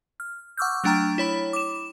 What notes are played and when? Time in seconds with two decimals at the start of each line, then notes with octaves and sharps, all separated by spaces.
0.20 F6
0.57 F#5 C#6 D6 E6 F6 G6
0.84 F#3 A3 D4 G5 A#5 F6
1.18 E4 C#5 B5
1.53 D6 E7